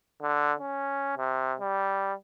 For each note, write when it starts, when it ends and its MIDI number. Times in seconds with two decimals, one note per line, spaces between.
0.22 0.53 50
0.60 1.15 61
1.17 1.55 48
1.60 2.13 55